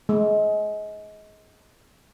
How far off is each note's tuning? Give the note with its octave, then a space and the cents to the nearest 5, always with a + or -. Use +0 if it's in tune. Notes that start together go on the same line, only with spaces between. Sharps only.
G#3 +25